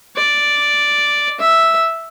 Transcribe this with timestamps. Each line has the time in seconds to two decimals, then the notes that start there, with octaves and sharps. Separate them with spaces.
0.17 D5
1.40 E5